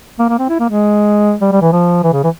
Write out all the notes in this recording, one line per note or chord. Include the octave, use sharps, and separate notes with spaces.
A#3
A#3
C4
E4
A#3
G#3
G3
G3
E3
F3
E3
C#3
E3